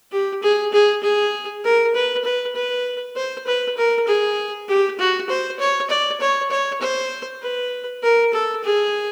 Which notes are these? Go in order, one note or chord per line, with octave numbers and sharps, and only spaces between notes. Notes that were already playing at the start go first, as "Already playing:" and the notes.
G4
G#4
G#4
G#4
A#4
B4
B4
B4
C5
B4
A#4
G#4
G4
F#4
C5
C#5
D5
C#5
C#5
C5
B4
A#4
A4
G#4